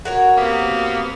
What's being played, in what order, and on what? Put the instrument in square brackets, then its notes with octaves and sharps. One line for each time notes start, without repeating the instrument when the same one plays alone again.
[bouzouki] F#4 A#4 C#5
[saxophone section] C3 A#3 B3